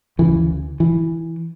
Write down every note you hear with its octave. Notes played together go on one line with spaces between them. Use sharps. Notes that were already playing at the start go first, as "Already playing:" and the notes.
D2 C#3 E3
E3